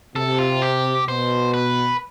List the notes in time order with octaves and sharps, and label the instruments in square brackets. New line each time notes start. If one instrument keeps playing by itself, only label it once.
[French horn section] C3 [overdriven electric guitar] A4
[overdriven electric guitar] F4
G4
[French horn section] B2 [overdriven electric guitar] C5
[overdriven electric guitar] B4